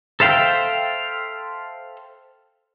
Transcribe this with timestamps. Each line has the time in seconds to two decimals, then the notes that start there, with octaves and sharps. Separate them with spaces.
0.20 A4 C5 E5 F5 G5